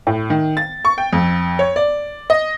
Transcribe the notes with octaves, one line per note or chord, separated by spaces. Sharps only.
A2
D#3
A6
C#6
G5
F2
C#5
D5
D#5